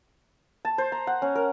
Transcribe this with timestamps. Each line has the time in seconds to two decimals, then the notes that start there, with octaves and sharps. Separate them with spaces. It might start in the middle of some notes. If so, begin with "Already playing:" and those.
0.65 A5
0.78 C5
0.92 A#5
1.07 F#5
1.22 C#4
1.35 A#4